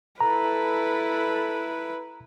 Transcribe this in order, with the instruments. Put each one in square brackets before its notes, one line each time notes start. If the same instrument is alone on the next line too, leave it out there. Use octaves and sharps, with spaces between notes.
[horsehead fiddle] E4 B4 [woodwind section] A4 [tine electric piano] A#5